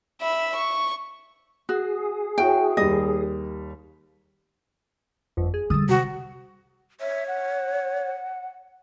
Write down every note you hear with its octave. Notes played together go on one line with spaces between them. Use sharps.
E5 B5
C#6
F#4 G#4
E4 F#4 C#5 G5
D#2 G3 D#5
G1 F2
G#4
D3 G3 D#6 E6 A6
C3 F#4
C#5 E5
F#5